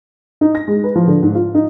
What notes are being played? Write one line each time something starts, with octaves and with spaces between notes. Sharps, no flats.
D#4
A#6
G#3
B4
F3
D3
G#2
F4
D#4